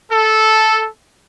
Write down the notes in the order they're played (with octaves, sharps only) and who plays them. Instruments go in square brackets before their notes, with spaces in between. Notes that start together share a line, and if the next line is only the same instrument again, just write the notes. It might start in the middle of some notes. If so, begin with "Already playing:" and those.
[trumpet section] A4